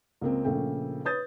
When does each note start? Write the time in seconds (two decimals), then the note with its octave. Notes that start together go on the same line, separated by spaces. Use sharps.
0.21 C#2 A#3 C4
0.44 A#1 C#3 A3 A#3 G5
1.05 B4 C#5 D#6 G6 A6